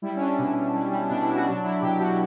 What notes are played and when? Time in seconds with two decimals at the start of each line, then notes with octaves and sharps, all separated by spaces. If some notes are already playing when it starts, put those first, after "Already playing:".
0.02 G3 E4
0.16 C#4
0.20 G3 D4
0.38 B2 C#4
0.56 B2
0.74 G3
0.91 G3
1.09 B2 D4
1.22 E4
1.28 B2
1.34 F#4
1.46 F#3 D4
1.64 F#3 E4
1.81 B2 G4
1.99 B2 F#4